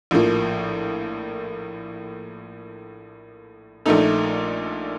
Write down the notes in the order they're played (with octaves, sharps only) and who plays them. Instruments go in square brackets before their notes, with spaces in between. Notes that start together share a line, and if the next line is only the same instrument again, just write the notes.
[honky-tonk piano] A#1 A2 F3 A#3
A#1 A#2 A3 D#4 A4